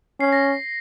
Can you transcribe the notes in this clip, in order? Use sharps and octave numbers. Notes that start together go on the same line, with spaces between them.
C#4 C7
A#6